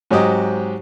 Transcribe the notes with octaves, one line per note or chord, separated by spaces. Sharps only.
G#2 F#3 C4 G4 D#5 D#6